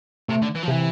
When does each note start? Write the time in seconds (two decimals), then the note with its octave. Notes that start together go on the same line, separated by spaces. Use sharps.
0.29 C3 A3
0.42 D3
0.55 E3
0.63 F3
0.68 C3 E3